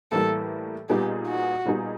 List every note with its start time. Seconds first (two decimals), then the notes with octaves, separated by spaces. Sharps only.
0.12 A2 E3 G3 A#3 A4
0.89 A#2 G3 B3 D#4 G4 G#4
1.28 F#4
1.65 A#2 G3 B3 D#4 G#4